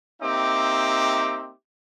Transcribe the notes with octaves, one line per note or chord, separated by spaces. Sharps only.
A#3 C4 D#4 G4 E5 D6